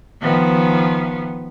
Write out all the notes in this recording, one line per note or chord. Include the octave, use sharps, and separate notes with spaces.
D#3 F3 B3